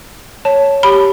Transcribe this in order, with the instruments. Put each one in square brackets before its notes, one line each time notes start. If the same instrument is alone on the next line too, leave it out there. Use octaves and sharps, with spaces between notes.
[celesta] C#5 [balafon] A5
[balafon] G4 B5